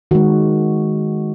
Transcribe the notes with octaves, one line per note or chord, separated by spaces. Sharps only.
D#3 G#3 F#4